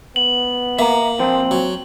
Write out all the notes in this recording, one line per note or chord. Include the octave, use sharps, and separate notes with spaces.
B3 F#7
A#3 E5 A#5
A#2 F3 C4
F#3